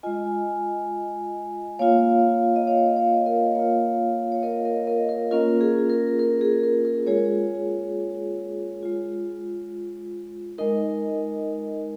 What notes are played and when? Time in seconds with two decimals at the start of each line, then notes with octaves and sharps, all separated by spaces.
0.03 G#3 F4 D#5 G#5
1.79 A#3 F4 C#5 F5
2.56 D#5
2.67 C#5 F5
2.96 C#5 F5
3.26 A#4 D#5
3.55 A#3 F4 C#5 F5
4.32 C#5
4.43 A#4 D#5
4.65 A#4 D#5
4.87 A#4 D#5
5.09 A#4
5.31 A#3 C#4 F4 A#4
5.61 G#4
5.90 A#4
6.19 A#4
6.41 G#4
6.63 A#4
6.85 A#4
7.07 G#3 F4 G#4 C#5
8.83 G#3 F4
10.58 G#3 D#4 A#4 D#5